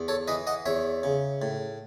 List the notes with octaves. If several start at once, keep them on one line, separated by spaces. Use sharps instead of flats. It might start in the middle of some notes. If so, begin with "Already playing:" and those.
Already playing: E2
A4 C#5
E3 B4 D#5
D#5 F#5
E2 C#5 E5
C#3
A2